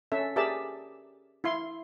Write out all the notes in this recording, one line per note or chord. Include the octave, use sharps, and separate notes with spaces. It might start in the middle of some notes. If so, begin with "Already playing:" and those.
C#4 A4 E5
G4 G#4 A#4 D5 E5 A5
E4 F5 C6